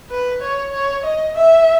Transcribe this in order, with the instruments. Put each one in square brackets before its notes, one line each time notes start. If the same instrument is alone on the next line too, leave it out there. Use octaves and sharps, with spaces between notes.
[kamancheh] B4
C#5
C#5
D#5
E5